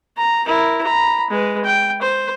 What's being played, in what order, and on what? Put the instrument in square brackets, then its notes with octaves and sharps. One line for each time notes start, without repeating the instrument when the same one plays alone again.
[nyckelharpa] A#5
E4 A#4
A#5 B5
G#3 B4
G5
C5